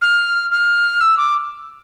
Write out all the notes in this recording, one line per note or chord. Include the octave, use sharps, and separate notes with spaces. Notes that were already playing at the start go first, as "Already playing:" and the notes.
F6
F6
E6
D6